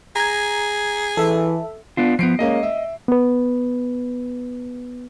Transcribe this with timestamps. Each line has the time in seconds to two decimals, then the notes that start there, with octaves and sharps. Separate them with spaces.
0.16 G#4 A#5 G#6
1.17 E3 A4 E5
1.97 B3 D4 F4
2.19 F3 B3 C7 D7
2.39 G#3 A#3 C#4 D#5
2.63 E5
3.08 B3 B4